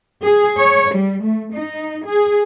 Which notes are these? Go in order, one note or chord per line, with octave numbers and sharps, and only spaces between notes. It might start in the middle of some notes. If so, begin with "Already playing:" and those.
G#4
C#5
G3
A3
D#4
G#4